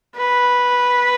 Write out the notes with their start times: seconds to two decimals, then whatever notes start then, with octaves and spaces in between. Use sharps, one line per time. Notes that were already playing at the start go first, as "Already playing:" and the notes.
0.17 B4